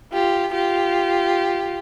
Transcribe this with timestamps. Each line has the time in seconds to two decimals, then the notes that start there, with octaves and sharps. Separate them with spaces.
0.13 F4 G4
0.53 F4 G4